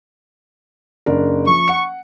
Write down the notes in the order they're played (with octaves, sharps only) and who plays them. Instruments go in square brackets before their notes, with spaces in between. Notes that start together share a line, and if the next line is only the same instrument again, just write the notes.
[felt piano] F#1 D4 A#4
[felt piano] F3 [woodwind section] C#6
[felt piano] F#5 C#7